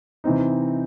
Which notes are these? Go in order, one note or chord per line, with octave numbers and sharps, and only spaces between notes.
C3 E3 C4 D#4